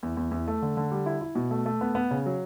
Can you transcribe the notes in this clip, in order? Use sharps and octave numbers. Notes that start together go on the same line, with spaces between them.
E2
E2
E2
A3
D3
D3
G3
E4
E4
B2
A3
A3
B3
B3
C#3
F#3